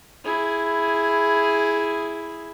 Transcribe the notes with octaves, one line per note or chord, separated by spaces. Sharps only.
E4 G#4